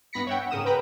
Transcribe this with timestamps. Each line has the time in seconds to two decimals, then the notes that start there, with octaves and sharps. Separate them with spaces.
0.13 G2 B3 B5 A#6 B6 C#7
0.27 C#5 E5 F#5 G5
0.50 G#2 C#3 A#4 D#6 E7
0.65 B4 G5 A#5 B5